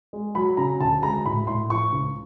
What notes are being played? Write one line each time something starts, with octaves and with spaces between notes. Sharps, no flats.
G#3
F#3 B5
C#3 A#5
D2 A5
G#3 A#5
A2 B5
A2 C6
F3 C#6
C#2